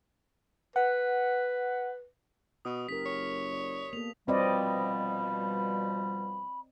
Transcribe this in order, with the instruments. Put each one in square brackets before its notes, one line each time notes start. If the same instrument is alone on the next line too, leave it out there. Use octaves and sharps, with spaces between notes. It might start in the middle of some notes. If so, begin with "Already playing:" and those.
[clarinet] B4 [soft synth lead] F#5
[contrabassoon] B2 [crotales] D#6
[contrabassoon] F#1 [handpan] G4 A#4 [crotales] B6
[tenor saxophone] C#5
[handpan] D5
[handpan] A#3 B3 A4 [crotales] F7
[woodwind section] B2 F3 G3 [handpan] C4 D5 D#5 [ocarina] B5